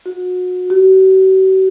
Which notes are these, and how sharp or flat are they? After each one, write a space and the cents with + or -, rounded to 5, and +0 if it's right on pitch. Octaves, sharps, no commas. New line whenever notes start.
F#4 -30
F#4 +45